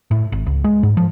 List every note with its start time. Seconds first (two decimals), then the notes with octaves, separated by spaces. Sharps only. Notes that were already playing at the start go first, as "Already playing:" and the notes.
0.11 A2
0.32 G#1
0.46 C#2
0.64 G#3
0.83 G#2
0.97 F3